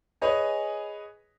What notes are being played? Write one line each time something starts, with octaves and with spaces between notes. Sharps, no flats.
G#4 B4 C#5 D#5 G#5